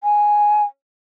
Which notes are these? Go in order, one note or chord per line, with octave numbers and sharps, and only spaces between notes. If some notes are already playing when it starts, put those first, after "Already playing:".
G#5